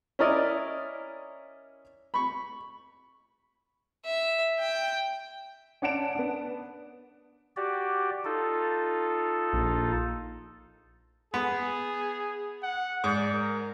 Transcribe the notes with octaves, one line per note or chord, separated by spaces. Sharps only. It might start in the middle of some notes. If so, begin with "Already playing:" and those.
C#4 E4 A#4 D5 D#5
B5 C#6
E5
G5
C#4 D5 F#5 A5 D7 E7
B3 D4
F#4 G4 D5
D#4 F4 A4
A#1
B3 G#4
F#5
G#2 D5
A#4